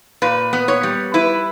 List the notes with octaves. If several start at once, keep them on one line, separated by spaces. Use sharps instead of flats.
A#2 B4
B3
C#5
G3
E4 B4